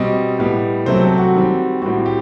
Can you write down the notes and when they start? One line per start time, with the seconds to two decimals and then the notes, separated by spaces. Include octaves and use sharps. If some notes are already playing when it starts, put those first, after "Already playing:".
Already playing: B2 G3 C4 D#5
0.39 A2 G3 B3
0.86 C3 F#3 A3 C4 C5
1.02 A4
1.18 F#4
1.34 D#3 G3 C4
1.82 A2 G3 C4 F#4
2.06 G4